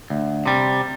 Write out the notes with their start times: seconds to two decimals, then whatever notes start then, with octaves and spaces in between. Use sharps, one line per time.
0.10 D2
0.46 C3 G3